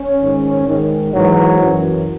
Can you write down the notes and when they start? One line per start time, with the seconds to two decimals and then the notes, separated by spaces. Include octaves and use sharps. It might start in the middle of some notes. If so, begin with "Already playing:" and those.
Already playing: C#4
0.18 G#2 D#3
0.66 G#2 D#3
1.13 G#2 E3 F#3
1.60 F#2 E3